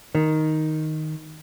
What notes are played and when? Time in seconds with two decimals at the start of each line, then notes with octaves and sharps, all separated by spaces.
0.15 D#3